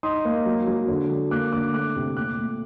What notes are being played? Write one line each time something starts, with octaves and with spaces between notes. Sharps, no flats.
D#4 C6 D#6
A#3
F#3
F#3
D3
F#3
A#3 D6 F#6
D3 D6 F#6
A3 D6 F#6
C3
A#2 D6 F#6
A3